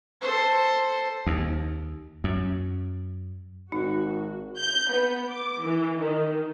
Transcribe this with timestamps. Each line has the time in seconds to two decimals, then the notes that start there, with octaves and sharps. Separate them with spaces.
0.21 A4 C5
1.27 D#2
2.24 F#2
3.72 G#1 D#4 F#4
4.59 G6
4.92 B3
5.31 D6
5.61 E3
5.97 D#3